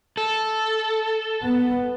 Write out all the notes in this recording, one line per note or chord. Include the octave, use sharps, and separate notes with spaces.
A4
B3